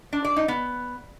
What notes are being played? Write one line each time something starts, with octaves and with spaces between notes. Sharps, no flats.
D4
D5
D#4
B3